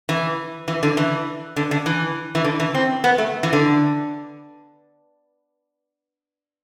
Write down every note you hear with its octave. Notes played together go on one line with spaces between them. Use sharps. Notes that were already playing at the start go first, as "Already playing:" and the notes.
E3
E3
D3
E3
D3
D3
E3
E3
D3
E3
C4
B3
A3
E3
D3